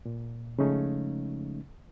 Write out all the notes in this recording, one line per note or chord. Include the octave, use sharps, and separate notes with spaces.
A#2
C#3 F3 G#3 A3 C#4 D#4